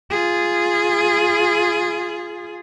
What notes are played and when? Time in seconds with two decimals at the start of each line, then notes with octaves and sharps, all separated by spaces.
0.10 F4 G#4